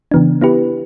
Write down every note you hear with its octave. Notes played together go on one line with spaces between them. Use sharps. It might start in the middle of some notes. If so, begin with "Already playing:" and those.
C#3 E3 B3 D4
B3 E4 G4 B4